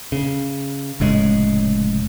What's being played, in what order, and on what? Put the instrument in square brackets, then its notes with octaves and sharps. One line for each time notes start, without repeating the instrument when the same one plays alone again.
[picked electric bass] C#3
F1 A2 C#3 G#3